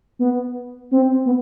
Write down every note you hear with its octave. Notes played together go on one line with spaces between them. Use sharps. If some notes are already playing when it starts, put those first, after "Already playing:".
B3
C4
B3